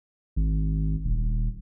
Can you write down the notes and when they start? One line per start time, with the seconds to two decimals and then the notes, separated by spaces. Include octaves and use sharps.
0.36 G#1
1.05 D#1